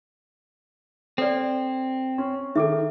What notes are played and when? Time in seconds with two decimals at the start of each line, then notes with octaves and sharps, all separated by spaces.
1.18 C4 A4 C#5 D5
2.18 C#4 C6
2.56 D#3 C#4 G#4 A4 E5 D6